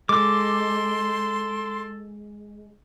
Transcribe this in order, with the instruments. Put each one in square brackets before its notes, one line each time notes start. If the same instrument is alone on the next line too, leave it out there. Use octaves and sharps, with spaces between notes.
[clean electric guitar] G#3 [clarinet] A4 [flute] C6 [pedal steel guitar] D6